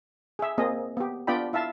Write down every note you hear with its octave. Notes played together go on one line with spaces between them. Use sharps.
G#4 E5
A#3 C4 G#4 D#5
B3 G4
B3 D4 F4 D5 G5 B5
E4 E5 F5 A5